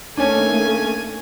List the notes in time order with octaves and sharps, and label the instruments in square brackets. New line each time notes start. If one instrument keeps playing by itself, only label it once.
[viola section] D#3 A3 A#3 [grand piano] C#4 D4 [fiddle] G#5